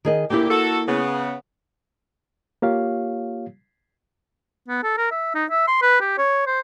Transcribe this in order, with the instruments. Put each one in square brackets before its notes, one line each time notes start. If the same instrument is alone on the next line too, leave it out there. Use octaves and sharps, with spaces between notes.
[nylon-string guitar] D#3 G#4 D#5
[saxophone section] D2 A#2 G4 [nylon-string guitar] A#3 E4
[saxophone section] F#4 A4
C#3 B3
[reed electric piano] A#3 F4 G4 C#5 F5
[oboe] B3
A4
A#4
E5
D#4
E5
C6
B4
G4
C#5
C5